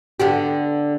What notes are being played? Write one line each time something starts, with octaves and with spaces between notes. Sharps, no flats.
D3 B3 G4